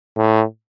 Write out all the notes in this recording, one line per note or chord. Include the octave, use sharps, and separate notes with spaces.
A2